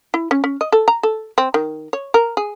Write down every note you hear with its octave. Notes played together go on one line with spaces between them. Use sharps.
E4
C#4
C#4
D#5
A4
A#5
A4
C4
D#3
C#5
A#4
G#4